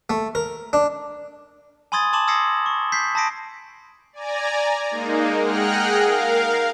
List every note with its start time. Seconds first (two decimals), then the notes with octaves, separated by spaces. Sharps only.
0.10 A3
0.35 A#4
0.73 D4
1.92 G#5 B5 C6 D#6 G#6 A6
2.13 A5 C6 D6 E7 F#7
2.28 D#6 E6 G#6 A#6 C7 C#7
2.66 C#6
2.92 G6 B6 C7
3.15 A5 B5 D#6 A#6 C7 D7
4.13 D5 G#5 A#5
4.91 G#3 A#3 D#4
5.41 G#4 F#5 G5 A#5 F6 F#6
6.02 A#4 F5